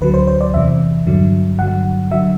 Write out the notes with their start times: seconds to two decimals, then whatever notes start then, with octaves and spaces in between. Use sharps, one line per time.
0.01 D2 D3 F#3 B4
0.14 C5
0.27 C5
0.41 D5
0.54 E2 C3 E3 E5
1.07 G2 D3 F#3
1.59 G2 D3 F#3 F#5
2.11 D3 F#3 E5